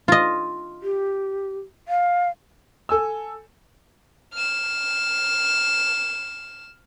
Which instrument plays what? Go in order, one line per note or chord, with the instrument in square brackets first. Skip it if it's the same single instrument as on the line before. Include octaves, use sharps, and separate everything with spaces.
[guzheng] F4 D#5
[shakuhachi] G4
F5
[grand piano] A4 G#5 E6
[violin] F6 E7